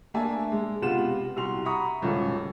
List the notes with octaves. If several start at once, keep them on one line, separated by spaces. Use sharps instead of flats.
A3 A#3 D4 E5 G#5 A5
G#3
C#2 C3 B3 F4 F#5 E7
C2 F#4 C6 F7
E5 F#5 A#5 B5 C#6 D#6
D#1 C#2 F#2 C#4 A4